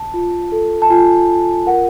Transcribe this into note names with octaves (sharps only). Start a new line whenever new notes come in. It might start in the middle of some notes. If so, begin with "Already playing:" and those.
Already playing: A5
F4
A4
A5
F4 G#5
F4
A#4 F#5